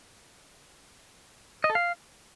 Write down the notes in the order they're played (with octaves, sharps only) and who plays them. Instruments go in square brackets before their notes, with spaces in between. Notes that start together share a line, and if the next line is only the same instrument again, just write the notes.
[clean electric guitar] D#5
A4
F5